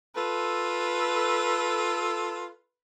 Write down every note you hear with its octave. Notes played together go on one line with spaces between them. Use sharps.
F4 A4 B4